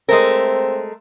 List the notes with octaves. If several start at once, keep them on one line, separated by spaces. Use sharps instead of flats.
G#3 A3 C4 A#4